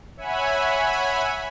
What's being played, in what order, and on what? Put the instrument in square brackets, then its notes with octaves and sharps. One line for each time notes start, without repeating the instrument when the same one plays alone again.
[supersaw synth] C#5 E5 F#5 G#5 B5